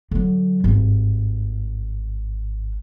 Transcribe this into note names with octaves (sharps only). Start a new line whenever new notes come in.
D3 F#3
G#1 G2